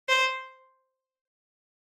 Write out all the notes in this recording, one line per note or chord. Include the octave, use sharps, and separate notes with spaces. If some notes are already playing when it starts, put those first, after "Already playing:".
C5